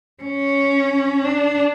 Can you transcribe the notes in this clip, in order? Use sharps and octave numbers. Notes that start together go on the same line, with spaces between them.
C#4
D4